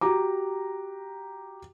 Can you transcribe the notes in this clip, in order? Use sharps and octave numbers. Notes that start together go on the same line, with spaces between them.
F#4 G4 A#5 D6